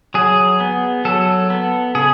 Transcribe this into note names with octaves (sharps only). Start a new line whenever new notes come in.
F#3 G#4
B3
F#3 A4
B3
C#3 G#4